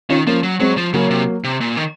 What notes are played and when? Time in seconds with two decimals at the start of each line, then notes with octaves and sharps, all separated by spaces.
0.10 D#3 C#4 F4
0.27 F3 A#3 C#4
0.43 F#3
0.60 F#3 G#3 C4
0.77 F3
0.93 C#3 F#3 A#3
1.10 C3
1.44 C3
1.61 A#2
1.77 D#3